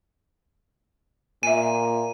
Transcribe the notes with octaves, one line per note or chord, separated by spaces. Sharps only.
A#2 E5 G#5 D#7